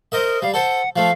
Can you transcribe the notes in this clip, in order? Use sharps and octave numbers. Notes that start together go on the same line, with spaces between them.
A#4 C5 D#5 E5
G3 F5
A4 C5 F#5
F3 A3 F5